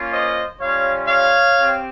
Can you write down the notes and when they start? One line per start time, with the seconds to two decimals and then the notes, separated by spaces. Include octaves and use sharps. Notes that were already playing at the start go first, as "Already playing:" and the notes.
Already playing: A#3 C#4 F4
0.12 C5 D#5
0.60 G3 C#4 F4 C#5 F5
1.08 C#5 F5
1.56 C4 G4